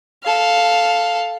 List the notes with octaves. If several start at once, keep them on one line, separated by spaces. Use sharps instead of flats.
A4 F5